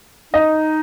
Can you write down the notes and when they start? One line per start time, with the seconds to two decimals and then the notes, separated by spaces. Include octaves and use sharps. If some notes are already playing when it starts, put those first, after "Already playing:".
0.33 D#4 D#5